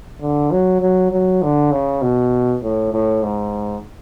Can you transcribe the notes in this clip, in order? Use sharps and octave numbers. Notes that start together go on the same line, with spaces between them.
D3
F#3
F#3
F#3
D3
C#3
B2
A2
A2
G#2